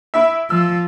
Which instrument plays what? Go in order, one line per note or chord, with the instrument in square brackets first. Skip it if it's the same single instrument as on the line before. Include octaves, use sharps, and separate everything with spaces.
[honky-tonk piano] E4 E5
[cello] F3 [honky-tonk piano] E6